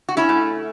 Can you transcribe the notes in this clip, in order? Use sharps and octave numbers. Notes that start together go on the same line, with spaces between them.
F#4
C#4 E4
A3